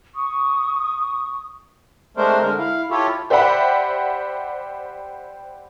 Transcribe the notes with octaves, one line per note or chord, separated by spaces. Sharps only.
C#6 D#6
G#3 A3 C4 D4 A#4 C5
D3 G#3 A#4
E4 F5
E4 F4 G4 A4 C#5
G4 C5 D5 E5 F#5 B5